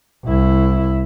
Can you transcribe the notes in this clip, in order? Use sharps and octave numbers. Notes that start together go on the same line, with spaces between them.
C2 E4